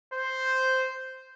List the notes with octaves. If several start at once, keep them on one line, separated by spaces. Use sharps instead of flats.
C5